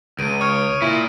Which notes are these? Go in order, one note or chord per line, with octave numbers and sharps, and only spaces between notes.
C#2 D7 D#7
C#5 D#6 F6
A#2 E4